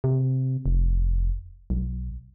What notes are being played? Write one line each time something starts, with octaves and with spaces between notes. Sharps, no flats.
C3
F1
B1